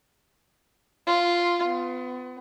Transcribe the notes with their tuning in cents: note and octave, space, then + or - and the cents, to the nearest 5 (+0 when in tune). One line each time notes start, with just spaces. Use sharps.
F4 -5
B3 +35